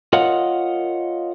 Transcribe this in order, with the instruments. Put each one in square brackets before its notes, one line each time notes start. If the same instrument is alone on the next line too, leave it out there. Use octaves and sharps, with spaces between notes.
[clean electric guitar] F4 A#4 C#5 D#5 F5 F#5